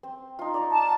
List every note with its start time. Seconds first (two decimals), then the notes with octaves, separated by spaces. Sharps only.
0.03 C4
0.39 D#4 F4
0.54 D5 A#5 C#6
0.71 A5